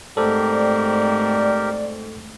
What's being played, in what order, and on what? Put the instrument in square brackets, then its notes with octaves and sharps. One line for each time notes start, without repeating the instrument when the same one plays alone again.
[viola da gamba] G#2 A3 C4 [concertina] G4 A#4 [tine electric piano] A4 C5 [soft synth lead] D5